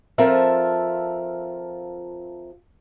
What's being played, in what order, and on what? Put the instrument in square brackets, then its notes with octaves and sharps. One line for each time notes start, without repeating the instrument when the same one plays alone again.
[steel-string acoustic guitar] F3 C4 F4 A4 A#4 E5